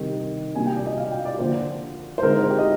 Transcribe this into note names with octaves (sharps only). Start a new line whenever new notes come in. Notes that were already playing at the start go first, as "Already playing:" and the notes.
Already playing: C3 D#3 G3
C3 G3 A#3 D4 G#5
G5
D5
D#5
F5
G5
D5
D3 F3 A#3 C5
C5
D3 G#3 C4 D#4 A#4
G4
D#5